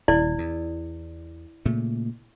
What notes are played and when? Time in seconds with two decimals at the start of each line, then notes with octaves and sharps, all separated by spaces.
0.08 D#1 D#2 E4 D5
0.38 E2
1.65 A#2 C#3 A3